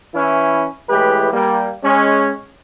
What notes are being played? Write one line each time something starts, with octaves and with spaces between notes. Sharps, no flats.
E3 C#4 E4
A2 E3 G#3 G4 B4
G3 A#3
G#3 C#4